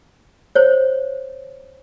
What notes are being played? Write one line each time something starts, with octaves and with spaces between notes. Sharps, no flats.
C5 C#5